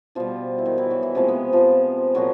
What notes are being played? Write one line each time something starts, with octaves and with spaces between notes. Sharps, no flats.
B2 F3 G3 F4
E4
D#3 D#4
E3 E4
F#3 F#4
E3 E4
C3 F3 G#3 A#3
B3
F3 F4
A#2 F3 F#3 F#4